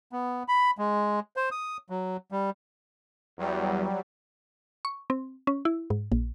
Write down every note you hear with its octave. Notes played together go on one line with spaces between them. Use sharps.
B3
B5
G#3
C5
D#6
F#3
G3
E2 F#3 G3
C#6
C4
C#4
E4
G#2
A#1